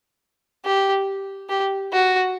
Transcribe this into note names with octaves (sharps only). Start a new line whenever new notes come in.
G4
G4
F#4